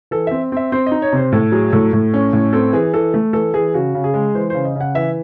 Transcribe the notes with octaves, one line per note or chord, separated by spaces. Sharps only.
E3 A4
C4 E5
C4 E5
C4 C5
D#5
D#4
C#5
C3 C5
A2 A4
F#3 G#4
A2 A4
A2
C#4
A2
C4 A4
E3 G#4
E3 A4
A3
E3 A4
E3 G#4
C#3 F#4
C#3
G#4
G#3
E3 C5
C#3 C5
D#5
C#3
F#5
E3 E5